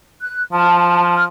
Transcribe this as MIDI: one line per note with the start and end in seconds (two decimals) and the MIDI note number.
0.21 0.42 90
0.53 1.28 53
0.53 1.13 81
0.53 1.13 89
1.13 1.23 89